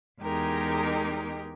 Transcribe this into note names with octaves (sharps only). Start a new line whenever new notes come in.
E2 G#3 D#4 G4 A#4